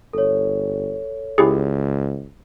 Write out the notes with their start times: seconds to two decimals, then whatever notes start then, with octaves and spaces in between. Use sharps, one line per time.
0.13 G1 A4 C#5
1.38 C#2 E4 G4 G#4